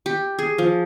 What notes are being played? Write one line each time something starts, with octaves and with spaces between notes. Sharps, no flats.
G4
G#4
F3